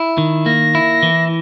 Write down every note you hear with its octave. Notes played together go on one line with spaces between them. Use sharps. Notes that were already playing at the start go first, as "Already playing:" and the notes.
Already playing: E4
D#3
A#3 A#6
E4
E3